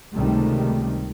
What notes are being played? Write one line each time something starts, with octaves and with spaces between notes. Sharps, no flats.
C#2 C3 D#3 G3 A3